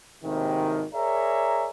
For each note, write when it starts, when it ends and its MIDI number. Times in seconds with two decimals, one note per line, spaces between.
0.24 0.84 32
0.24 0.84 39
0.24 0.84 45
0.24 0.84 48
0.24 0.84 51
0.94 1.69 68
0.94 1.69 70
0.94 1.69 73
0.94 1.69 74
0.94 1.69 76
0.94 1.69 82